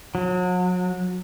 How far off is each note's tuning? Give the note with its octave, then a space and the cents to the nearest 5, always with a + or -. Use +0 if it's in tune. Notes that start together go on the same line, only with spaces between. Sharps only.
F#3 -35